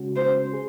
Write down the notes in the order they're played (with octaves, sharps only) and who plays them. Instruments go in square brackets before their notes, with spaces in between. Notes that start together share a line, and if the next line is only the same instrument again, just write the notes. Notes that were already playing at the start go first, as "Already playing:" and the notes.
Already playing: [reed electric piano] C#3 G#3 C#4 F#4
[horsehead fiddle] C5
[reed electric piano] G#4